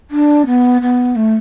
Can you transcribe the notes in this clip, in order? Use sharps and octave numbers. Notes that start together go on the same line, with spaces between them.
D4
B3
B3
A3